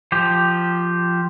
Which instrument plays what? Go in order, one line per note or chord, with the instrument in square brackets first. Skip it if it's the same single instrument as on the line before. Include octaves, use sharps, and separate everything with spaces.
[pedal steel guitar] F3 G4